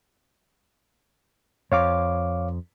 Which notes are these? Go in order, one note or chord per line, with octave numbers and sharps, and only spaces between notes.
F2 C#5 F5 D6